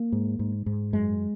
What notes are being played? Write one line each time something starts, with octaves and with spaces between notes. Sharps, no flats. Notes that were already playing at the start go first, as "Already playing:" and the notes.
Already playing: A#3
G#2
G#2
G#2
F#2 G#3